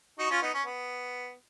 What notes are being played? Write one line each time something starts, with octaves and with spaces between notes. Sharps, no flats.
D#4 F#4
C#4 F4
B3 D#4
C#4
B3